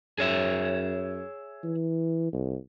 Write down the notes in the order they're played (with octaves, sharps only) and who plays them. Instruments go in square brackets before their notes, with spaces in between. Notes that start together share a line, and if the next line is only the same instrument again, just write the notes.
[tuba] F#2 [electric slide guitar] G#4 C#5 E5
[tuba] E3
C2